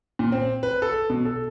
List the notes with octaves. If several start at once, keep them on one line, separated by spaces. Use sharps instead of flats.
A#2
C4
B4
A4
B2
A4